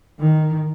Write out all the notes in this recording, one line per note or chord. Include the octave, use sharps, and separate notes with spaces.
D#3